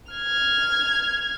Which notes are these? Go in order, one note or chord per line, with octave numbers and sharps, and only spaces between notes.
F6 G#6